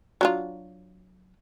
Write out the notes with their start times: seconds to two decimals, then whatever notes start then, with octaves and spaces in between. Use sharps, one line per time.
0.21 F#3 D4 F4